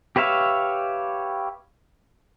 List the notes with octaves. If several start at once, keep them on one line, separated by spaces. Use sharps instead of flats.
G4 B4 C#5 E5 F5